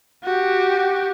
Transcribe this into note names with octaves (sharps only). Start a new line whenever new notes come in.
F#4 G4